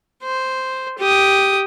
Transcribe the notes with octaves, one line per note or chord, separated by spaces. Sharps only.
C5
G4 D#6